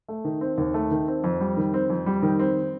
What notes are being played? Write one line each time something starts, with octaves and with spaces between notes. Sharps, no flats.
A3
D#3
C4
D#2
A3
D#3
C4
F2
G3
D#3
C4
F2
G3
D#3
C4